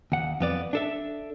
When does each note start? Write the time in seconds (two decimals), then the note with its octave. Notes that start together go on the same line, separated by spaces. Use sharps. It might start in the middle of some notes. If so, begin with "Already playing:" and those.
0.12 D#2 F#5
0.40 F2 B3 D5
0.73 D4 A4 E5